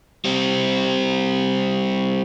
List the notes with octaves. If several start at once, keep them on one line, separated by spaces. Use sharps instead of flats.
G3 C4